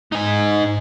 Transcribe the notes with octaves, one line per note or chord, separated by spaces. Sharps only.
G#2 D#4 G#5